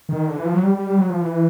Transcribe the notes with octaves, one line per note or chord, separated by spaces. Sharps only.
D#3
D3
E3
F3
F#3
G3
G3
G3
F#3
F3
E3